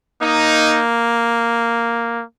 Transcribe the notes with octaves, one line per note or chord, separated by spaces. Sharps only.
A#3 D#4